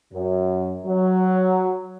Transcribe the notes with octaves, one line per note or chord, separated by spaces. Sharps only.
F#2
F#3